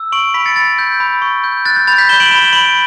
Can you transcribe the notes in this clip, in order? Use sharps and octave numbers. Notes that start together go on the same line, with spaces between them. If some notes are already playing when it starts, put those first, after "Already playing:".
Already playing: E6
C#6 D7 F#7
B5 B6 D7
A6 C#7
B5 A6
A6
G6
B5
C#6
G6
F#6 A6
G6
B5 A6
G6 B6
B5 E7 G7
D7 F#7
B5 E7 G7
E7 G7
B5 D7 F#7